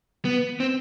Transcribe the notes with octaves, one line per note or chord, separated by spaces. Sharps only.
B3
C4